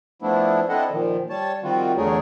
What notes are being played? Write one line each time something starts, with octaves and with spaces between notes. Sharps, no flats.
F3 A3 B3 D4 E4
C4 D4 E4 A4 D#5 F#5
A#2 D#3 F3
G3 C#5 A5
D#3 F3 G3 C4 F4 F#4
E2 D3 A3 G#4 A#4 C#5